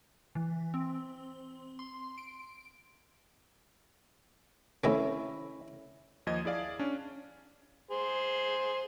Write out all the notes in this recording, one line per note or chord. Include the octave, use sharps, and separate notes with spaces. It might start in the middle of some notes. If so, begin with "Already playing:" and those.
E3
C4
C6
D7
A2 C3 D#3 C#4 E4
D#2 F3 D#5 G#6
E4 G#4 D5 F5
C#4 D4
G#4 C5